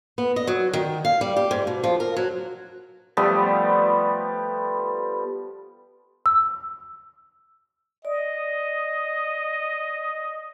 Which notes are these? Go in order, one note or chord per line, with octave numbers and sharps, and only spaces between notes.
B3
D#5
F#3
D#3
F5
G3
G4
G#2
B2
F3
A#4
F#3
F3 G3 A3 B3
E6
D5 D#5